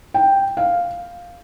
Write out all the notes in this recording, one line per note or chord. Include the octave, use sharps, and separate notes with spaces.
G5
F5